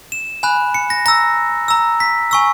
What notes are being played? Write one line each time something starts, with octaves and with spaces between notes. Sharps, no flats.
E7
G#5 B5 F#6
C#7
A#6
A#5 E6 A#6
A#5 E6
B6
G#5 C#6 E6